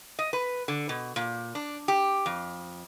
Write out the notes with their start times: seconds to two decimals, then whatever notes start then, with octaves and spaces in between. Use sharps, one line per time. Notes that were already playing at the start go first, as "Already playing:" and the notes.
0.19 D#5
0.33 B4
0.68 D3
0.89 B2
1.16 A#2
1.55 D4
1.88 G4
2.26 F2